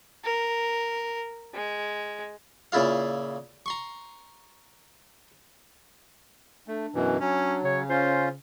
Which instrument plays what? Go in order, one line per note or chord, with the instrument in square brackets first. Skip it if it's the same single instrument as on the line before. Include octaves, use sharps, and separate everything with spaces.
[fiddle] A#4
G#3
[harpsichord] A#2 C#3 E4 F4 F5
A#5 C6 C#6
[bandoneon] A3 [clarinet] D4
[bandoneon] F#2 B2 E3
[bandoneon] F#3 [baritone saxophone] C#4
[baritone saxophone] C#3 [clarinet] C#5
[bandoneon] C#4 F4 [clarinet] C5